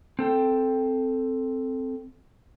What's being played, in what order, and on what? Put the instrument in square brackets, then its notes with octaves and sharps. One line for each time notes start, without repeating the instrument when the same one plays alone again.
[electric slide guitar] C4 A4 G5